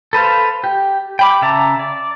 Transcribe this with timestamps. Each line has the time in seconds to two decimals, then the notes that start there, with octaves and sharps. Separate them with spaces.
0.13 A4 B4 C5 F5
0.64 G4
1.19 G5 B5 D6
1.42 C#3 E5 A5 A#5
1.79 D5